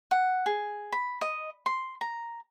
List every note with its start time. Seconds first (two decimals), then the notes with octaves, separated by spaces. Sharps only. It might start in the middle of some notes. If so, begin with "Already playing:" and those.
0.11 F#5
0.46 G#4
0.92 B5
1.21 D#5
1.66 C6
2.01 A#5